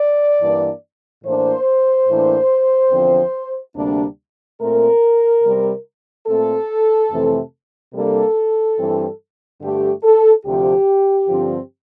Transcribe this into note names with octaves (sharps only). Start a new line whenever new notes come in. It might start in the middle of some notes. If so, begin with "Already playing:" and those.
Already playing: D5
G2 E3 A#3 D4
A2 E3 A#3 D4 C5
A2 E3 A#3 D4
E2 D3 F3 C4
D2 C3 G3 A#3 D4
A#2 A3 C4 A#4
C3 G3 C4
A#2 A3 C4 A4
F2 C3 E3 A3 C4
C3 G3 A#3 D4 A4
G2 E3 G3 C4
G2 D3 A3 D4 G4
A4
D2 C3 F3 G4
G2 D3 F3 C4